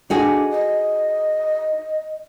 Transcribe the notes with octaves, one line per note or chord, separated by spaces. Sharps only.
D4 D#4 F#4 G#4
D#5